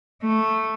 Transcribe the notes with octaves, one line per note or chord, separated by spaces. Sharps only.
A3